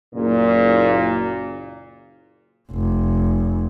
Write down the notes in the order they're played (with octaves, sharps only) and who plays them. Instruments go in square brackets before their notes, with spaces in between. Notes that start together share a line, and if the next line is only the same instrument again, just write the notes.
[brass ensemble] F#1 A#2
[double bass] F1